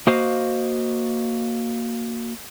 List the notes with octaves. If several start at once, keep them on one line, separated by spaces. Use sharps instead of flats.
A#3 F#4 C5 D#5 F5